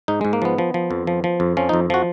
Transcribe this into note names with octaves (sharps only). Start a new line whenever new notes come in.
G#2 D#4
G#2 G#3
A#3
F3 B3
F3
F3
F2
F3
F3
F2
F3 C#4
F2 D#4
F3 F#4